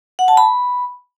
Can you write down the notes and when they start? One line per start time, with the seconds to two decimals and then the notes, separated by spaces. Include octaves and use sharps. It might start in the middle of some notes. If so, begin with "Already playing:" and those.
0.19 F#5
0.28 A5
0.37 B5